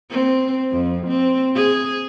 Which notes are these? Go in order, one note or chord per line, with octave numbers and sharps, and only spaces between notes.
C4
F2
C4
G#4